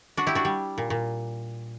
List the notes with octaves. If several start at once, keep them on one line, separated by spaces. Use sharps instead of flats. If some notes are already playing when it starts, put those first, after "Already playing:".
D4 F#4
E4 G4
D4 F#4
G3
A#2
A#2